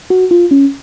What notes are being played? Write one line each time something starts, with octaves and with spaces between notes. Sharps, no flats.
F#4
F4
C#4